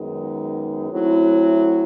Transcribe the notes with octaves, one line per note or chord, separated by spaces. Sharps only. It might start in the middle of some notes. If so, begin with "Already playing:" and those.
Already playing: F#2 D#3 G#3 B3 D#4
F#3 A3 C4 E4